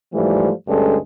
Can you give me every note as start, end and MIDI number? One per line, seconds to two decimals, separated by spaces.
0.13 0.50 44
0.13 0.50 52
0.13 0.50 53
0.13 0.50 55
0.13 0.50 57
0.67 0.97 38
0.67 0.97 43
0.67 0.97 56
0.67 0.97 61
0.67 0.97 69